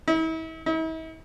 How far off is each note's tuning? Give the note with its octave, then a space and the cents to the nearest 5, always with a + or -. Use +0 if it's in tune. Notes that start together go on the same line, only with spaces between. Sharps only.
E4 -40
E4 -45